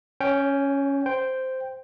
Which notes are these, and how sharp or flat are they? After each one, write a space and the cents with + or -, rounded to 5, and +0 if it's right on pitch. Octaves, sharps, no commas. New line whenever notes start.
C#4 +0 C#5 +40 G5 +0
C5 -10 G5 +0